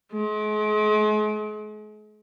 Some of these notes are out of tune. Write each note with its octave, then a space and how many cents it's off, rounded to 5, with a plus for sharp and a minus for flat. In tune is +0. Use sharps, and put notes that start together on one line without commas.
G#3 +40